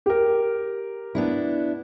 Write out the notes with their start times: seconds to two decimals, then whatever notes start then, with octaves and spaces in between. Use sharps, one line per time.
0.06 G4 A#4
1.15 B3 D4 E4